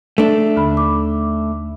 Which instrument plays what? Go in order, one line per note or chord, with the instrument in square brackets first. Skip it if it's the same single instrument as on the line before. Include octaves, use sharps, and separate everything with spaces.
[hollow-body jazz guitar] A3 D4
[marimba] D#2 D3 B5
D6